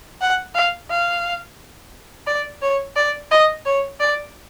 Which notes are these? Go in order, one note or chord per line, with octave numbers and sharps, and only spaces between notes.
F#5
F5
F5
D5
C#5
D5
D#5
C#5
D5